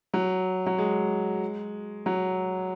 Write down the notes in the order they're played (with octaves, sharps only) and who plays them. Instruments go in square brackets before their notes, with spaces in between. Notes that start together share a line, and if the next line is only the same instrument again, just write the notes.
[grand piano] F#3
F#3
G#3
F#3